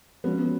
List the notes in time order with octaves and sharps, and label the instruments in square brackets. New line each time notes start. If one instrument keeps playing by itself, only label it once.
[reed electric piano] F3 G#3 C#4 F#4 [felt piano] B3